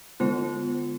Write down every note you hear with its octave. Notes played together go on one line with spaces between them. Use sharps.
D3 G#3 B3 F4 C5